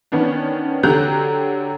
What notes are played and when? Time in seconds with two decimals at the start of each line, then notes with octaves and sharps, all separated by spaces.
0.12 D#3 B3 C#4 D4
0.83 D3 F#3 G4 A#5 F#6 G6